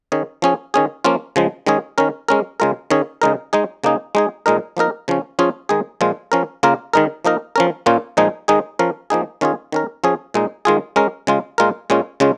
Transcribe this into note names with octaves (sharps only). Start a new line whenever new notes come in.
D#3 C#4 G#4
F3 C#4 G#4
D#3 C#4 G#4
F3 A#3 C#4 F4
C#3 F3 G#3
D#3 G#3 C#4 G#4
D#3 C#4 A#4
G#3 C#4 A#4
C#3 G#3 F4 A#4
D#3 C#4 G#4
C#3 G#3 D#4 A#4
G#3 D#4 G#4
C#3 A#3 D#4 G#4
G#3 D#4 G#4
A#2 G#3 D#4 A#4
F3 A#3 D#4 A#4
C#3 F3 C#4
F3 C#4 F4 G#4
D#3 G#3 D#4 G#4
A#2 F3 G#3 F4
F3 C#4 A#4
C#3 A#3 F4 A#4
D#3 G#3 D#4 A#4
F3 A#3 D#4 A#4
F3 C#4 A#4
A#2 A#3 C#4 F4
A#2 F3 G#3 D#4 G#4
D#3 G#3 D#4 G#4
F3 C#4 A#4
F3 A#3 D#4 G#4
D#3 C#4 F4 G#4
D#3 C#4 A#4
F3 C#4 G#4
A#2 G#3 D#4
D#3 G#3 F4 G#4
G#3 C#4 A#4
C#3 G#3 F4
A#2 G#3 F4 A#4
A#2 G#3 C#4 F4
C#3 G#3 C#4 F4